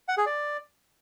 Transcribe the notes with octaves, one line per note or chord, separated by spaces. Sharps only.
F#5
G#4
D5